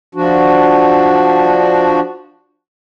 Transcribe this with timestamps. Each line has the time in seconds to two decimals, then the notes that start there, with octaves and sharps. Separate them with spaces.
0.15 F3 D4 F#4